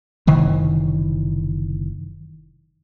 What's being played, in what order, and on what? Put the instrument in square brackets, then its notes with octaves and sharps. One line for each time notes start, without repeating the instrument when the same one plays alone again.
[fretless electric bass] F#1 C3 D#3 E3